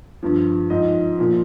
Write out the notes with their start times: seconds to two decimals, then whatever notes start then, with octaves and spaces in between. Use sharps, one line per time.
0.23 G2 F3
0.70 G#2 F3 D#5
1.19 A#2 F3